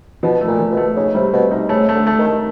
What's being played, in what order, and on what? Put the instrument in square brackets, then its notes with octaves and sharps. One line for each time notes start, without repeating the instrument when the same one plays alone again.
[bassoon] B2 [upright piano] F3
[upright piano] A3
[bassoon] A#2
[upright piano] F3
[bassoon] B2
[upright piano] A3
[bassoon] C#3 [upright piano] D#4
[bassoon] C3 [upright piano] G3
[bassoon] B2 [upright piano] C4
[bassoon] C3 [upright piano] D#4
[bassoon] C#3 [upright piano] A3
[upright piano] A3
[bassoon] D3
[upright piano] A3
[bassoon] D#3
[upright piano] A3